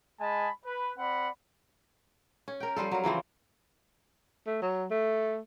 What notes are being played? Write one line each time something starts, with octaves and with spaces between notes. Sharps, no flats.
G#3 D#5 G#5 A5 B5
B4
C4 D5 F#5 B5
C#4
A#4 G5
F3 G3 F4 A4
F#3 A#4
C#3 E3 F3 C4
A3
F#3
A3